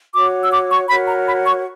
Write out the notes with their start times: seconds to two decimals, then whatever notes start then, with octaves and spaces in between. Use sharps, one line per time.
0.14 F#4 C#5 D6
0.44 E6
0.52 D6
0.71 C#6
0.89 F#4 A#4 C#5 B5
1.08 A#5
1.27 B5
1.46 C#6